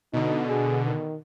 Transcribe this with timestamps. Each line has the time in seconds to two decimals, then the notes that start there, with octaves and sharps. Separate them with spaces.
0.14 B2 D3 D#4
0.48 G#4
0.86 D#3